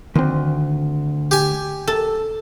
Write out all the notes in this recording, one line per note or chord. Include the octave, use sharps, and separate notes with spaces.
D2 D#3 C4
G4 G#5
A4